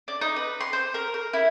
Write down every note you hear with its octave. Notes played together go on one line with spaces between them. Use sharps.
D4
D#4
B4
C6
C5
A#4
A#4
E4